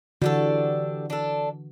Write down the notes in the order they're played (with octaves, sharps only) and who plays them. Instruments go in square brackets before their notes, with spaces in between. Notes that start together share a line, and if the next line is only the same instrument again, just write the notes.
[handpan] D3 E3 F#4 [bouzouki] G3 D4 A4
[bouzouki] D4 A4